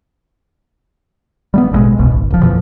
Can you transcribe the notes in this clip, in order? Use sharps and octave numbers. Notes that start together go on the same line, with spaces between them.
G3 A3 B3
A1 G2 B2 G#3
D#1 C2 B2
G#1
D1 F3
F2 A#2 E3 F3